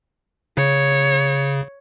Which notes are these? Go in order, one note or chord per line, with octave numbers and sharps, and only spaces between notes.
C#3 C#5